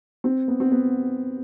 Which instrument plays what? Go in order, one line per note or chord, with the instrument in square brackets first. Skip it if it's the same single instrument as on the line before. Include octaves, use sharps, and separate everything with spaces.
[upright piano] C4
B3
C4
B3